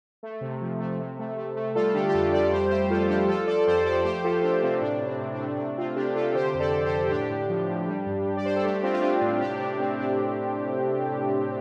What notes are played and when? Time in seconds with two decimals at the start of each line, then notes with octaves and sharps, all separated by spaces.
0.23 A3
0.41 C3
0.61 F3
0.80 A3
0.99 C3
1.18 A3
1.37 A3
1.56 A3
1.75 G3 F4 A4
1.94 D3 D4 G4
2.09 G4
2.14 F2 F4 A4
2.32 G3 A4 D5
2.52 F2 G4 C5
2.71 A3 G4 C5
2.90 F2 F4 A4
3.09 F2 D4 G4
3.28 F3 F4 A4
3.47 F3 A4 D5
3.67 F2 G4 C5
3.85 F3 A4 D5
4.04 A3 G4 C5
4.24 A3 F4 A4
4.43 A3 D4 G4
4.62 C3 C4 F4
4.81 A2 D4
5.00 A2
5.06 C4
5.19 A2
5.33 D4
5.39 A3
5.58 C3 D4
5.77 C3 C4 F4
5.96 C3 D4 G4
6.15 C3 F4 A4
6.35 D3 G4 C5
6.54 F2
6.60 A4 D5
6.72 D3
6.85 G4 C5
6.92 D3
7.11 A2 D4 G4
7.30 A2
7.49 F3
7.69 A2
7.87 G3
8.06 G2
8.25 G2
8.36 D5
8.45 G3 C5
8.56 A4
8.64 A3 D4 G4
8.83 A3 C4 F4
8.94 F4
9.02 A3 D4
9.21 A2
9.40 C3 D4 G4
9.59 C3 D4
9.79 A3 C4
9.98 C3 D4